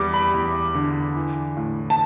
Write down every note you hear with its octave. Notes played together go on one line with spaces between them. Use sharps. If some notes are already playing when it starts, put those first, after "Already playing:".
Already playing: E2 G3 D6
B5
E2
D3
E3
A2
A5